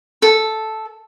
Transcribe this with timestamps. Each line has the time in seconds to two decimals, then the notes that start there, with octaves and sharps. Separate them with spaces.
0.22 A4